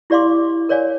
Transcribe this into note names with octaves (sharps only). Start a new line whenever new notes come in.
E4 G4 D5 F5 C6 D6
A#4 C#5 D5 F5 G#5